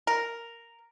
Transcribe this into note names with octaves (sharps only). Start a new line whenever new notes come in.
A#4